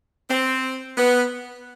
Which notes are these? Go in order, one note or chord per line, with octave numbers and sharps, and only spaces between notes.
C4
B3